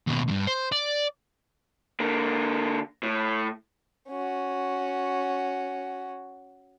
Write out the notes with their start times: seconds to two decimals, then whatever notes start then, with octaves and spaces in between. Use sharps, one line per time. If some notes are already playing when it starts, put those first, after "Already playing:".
0.07 D#2 B2
0.28 E2 G2
0.47 C5
0.72 D5
2.00 D3 A#3
3.03 A2
4.08 C#4 F#4